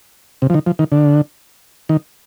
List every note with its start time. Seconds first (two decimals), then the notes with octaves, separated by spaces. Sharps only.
0.42 C3
0.50 F3
0.54 D#3
0.66 F3
0.79 D#3
0.92 D3
1.89 D#3